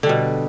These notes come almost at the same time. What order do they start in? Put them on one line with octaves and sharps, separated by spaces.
D3 G3 B2